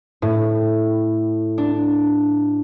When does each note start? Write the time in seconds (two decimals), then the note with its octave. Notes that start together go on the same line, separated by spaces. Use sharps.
0.22 A2
1.58 D4